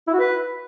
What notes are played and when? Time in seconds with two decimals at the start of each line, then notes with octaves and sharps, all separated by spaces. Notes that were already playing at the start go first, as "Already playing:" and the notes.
0.07 E4
0.13 F#4
0.19 B4